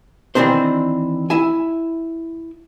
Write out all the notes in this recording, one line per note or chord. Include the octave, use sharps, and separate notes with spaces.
D#3 E3 G#3 C4 D4 C5
E4 E5 G#5